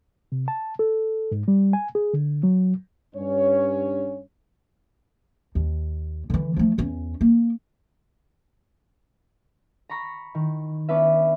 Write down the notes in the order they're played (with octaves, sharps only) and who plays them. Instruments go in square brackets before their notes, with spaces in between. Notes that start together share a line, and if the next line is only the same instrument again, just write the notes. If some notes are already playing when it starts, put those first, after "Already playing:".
[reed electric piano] C3
A5
A4
G#2
G3
G#5
G#4
D3
F#3
[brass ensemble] G2 C#4 C#5
[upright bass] D#2
D3 E3
F3 A3
E2 C#4
A#3
[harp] A#5 B5 C#6 A#6 B6
D#3
B3 C#4 D4 B4 E5